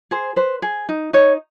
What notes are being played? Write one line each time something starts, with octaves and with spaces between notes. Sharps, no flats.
G#4 C5
B4 C5
G#4
D#4
D#4 C#5